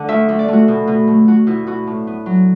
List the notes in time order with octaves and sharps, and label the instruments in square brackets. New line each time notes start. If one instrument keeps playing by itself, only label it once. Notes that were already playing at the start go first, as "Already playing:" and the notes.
Already playing: [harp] D3 A3 D5 F#5
D2 E5
D2
D5
A3 F#4
B2
B2
A3
A3 F#4
B2 E4
B2 F#4
A2
B3
F#3